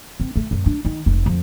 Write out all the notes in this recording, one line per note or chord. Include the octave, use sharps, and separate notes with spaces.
C4
A3
F#2
D4
D#3
F1
F2